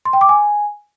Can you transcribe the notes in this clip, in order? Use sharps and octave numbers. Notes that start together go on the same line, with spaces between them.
C6
G5
D6
G#5